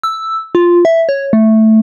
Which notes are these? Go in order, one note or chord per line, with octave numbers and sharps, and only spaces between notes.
E6
F4
E5
C#5
A3